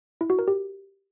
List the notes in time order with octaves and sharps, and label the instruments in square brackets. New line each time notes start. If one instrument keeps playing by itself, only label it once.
[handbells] E4
F#4
A#4
G4